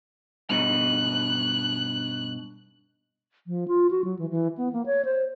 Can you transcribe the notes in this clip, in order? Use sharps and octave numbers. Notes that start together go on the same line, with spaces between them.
G2 B2 D#4 F#6
F3
F4
F#4
F#3
E3
E3
B3
A#3
C#5
C5